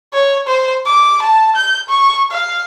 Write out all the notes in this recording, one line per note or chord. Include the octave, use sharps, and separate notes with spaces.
C#5
C5
D6
A5
G6
C#6
F5